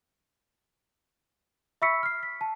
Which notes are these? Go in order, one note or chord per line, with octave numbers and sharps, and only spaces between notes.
E5 B5 C#6 E6 B6 C#7
F6 C7
B6
A5